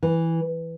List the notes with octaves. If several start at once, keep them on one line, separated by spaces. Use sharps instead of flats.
E3